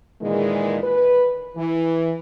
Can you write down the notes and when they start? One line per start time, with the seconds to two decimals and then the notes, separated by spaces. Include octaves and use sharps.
0.22 A#2 D#3 E3 G#3
0.82 B4
1.56 E3